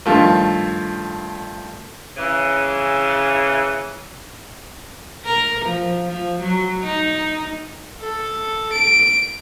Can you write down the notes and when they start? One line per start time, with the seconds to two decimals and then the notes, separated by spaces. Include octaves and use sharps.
0.06 G2 D#3 F3 A3
2.16 C#3 E3
5.25 A#4
5.65 F3
6.06 F3
6.42 F#3
6.84 D#4
8.00 A4
8.73 D7